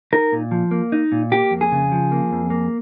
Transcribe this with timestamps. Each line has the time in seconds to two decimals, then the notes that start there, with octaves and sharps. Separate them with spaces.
0.13 D#4 A#4
0.32 A#2
0.51 F3
0.71 A#3
0.92 D#4
1.12 A#2
1.32 A#3 G4
1.51 F2
1.61 G#4
1.72 C#3
1.92 F3
2.12 A#3
2.32 F2
2.50 A#3